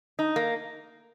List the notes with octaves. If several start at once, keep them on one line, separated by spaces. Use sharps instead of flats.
D#4
A#3